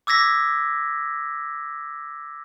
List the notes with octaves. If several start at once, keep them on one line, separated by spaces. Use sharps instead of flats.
D6 E6 G#6 A#6 B6